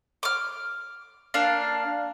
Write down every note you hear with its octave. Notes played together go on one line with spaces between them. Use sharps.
D6 F6
A#3 D4 F5 A5